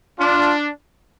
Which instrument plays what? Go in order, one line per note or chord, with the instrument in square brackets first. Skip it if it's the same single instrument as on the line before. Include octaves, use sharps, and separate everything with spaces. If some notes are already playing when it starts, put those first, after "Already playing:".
[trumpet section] D4 [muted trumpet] F4